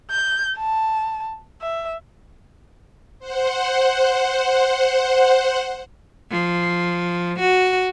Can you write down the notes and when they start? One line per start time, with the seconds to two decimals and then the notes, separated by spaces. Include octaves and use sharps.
0.11 G6
0.58 A5
1.61 E5
3.19 C5 F#5
6.31 F3
7.40 F#4